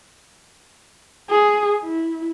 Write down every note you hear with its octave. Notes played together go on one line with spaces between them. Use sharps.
G#4
E4